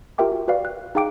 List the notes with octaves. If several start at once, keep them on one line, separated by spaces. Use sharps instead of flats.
F4 G4 A#4 E5 G5 D6
F#4
F#4 B4 D5 F5
F#6
D#4 G#4 F5 G5 D6 D7